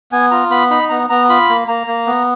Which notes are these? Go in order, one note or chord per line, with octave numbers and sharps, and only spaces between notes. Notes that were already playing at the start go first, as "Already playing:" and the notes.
B3 G#5
F4 A#5
B3 B5
D#4 B5
B3 A#5
B3 A#5
F4 B5
A#3
A#3 A#5
A#3
B3